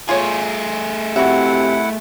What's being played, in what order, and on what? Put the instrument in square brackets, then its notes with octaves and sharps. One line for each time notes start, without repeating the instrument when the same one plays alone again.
[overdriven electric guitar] A3 G#4 [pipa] F4 C#5
[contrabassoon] C3 [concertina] E4 F#5 [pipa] F#4 E5